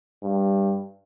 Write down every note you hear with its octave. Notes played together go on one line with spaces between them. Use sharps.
G2